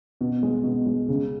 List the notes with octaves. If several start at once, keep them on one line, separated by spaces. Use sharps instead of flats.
B2
G#3
B2
G#3
C#3